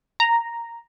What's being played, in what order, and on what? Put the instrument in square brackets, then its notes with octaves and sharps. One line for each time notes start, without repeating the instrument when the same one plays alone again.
[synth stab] A#5